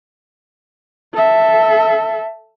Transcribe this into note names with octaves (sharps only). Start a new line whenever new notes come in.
A4 E5